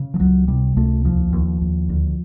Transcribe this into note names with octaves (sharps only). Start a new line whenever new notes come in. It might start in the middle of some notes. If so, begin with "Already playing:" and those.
Already playing: C#3
F3
C#2 F#3
C3 G3
C#2 A3
D#2 F3
D#2
D#2
D2